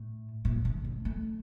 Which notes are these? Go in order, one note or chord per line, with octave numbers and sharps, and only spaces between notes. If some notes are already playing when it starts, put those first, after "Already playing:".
Already playing: A2
A#2
D3
A3
A3